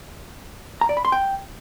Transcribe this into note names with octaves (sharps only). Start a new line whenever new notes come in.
A#5
D5
B5
C6
G5